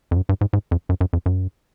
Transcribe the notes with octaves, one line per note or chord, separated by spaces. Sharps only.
F2
F#2
G2
G#2
G#2
F2
F#2
F#2
F2
F#2